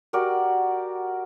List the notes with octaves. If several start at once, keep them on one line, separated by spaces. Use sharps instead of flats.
F#4 G4 A#4 D5